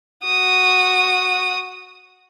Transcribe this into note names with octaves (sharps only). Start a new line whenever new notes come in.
F#4 D#6